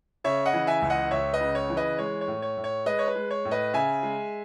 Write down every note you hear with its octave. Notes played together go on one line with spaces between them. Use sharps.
C#3 C#5 E5
D#5 F#5
E3
E5 G#5
C#2
D#5 F#5
C#2 C#5 E5
B4 D#5
C#3
C#5
E3
B4 D#5
G#3 C#5
C#5
A2
C#5
A2
C#5
G#3 B4 D#5
C#5
B4
G#3
C#5
A2
B4 D#5
C#3 E5 G#5
G#3